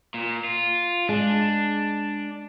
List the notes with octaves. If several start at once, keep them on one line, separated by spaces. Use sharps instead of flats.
A#2
F4
G#3 D4